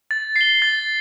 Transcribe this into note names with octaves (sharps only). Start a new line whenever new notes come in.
A6
C7
G7
A6